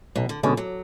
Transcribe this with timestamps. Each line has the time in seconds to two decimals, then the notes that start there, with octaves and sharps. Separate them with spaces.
0.16 B1 B2
0.29 D3
0.43 B2 D3 G#3 C#4
0.57 F#3